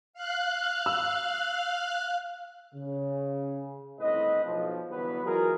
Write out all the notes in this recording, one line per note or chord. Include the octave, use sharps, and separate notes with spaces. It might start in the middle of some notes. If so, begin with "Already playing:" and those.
F5 F#6
E6
C#3
G1 A2 C#3 C4 B4 D#5
B1 F3
G1 E2 E3 F#3 B3 B4
E3 F#3 G#3 F4 G#4 A#4